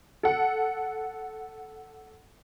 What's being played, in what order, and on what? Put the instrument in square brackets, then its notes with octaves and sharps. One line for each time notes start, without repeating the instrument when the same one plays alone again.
[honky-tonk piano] A4 F#5